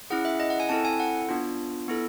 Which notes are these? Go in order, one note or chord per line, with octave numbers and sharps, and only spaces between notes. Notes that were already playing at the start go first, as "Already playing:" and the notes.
C#4 E4 G#4 F#5
E5
D#5
F#5
G#5
C4 E4 A4 A5
G#5
F#5
B3 D4 F4
B3 E4 A4